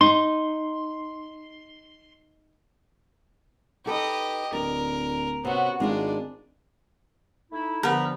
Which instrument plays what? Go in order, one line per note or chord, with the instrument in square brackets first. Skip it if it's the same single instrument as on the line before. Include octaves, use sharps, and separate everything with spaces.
[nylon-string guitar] D#4 [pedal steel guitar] C6
[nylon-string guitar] D#4 A4 B4 [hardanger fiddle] G4 D#5
[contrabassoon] D1 [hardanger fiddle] A#4 [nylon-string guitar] D5
[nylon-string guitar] C3 C#4 [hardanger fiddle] B3 F#4
[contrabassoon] G#1 [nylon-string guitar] G#3 F4 G#4 [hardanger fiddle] D4
[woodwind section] A3 D#4 E4
[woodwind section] G2 F3 B3 [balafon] D3 F#5 [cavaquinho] A#4 B4